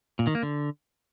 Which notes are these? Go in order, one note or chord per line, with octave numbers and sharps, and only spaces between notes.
A#2
D#3
A#3
D3